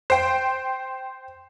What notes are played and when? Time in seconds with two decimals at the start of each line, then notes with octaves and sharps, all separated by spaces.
0.10 C5 G5